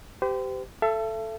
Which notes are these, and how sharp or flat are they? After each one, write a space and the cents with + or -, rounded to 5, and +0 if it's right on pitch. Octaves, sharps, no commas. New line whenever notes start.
G4 -10 C5 -40
A4 +0 E5 +35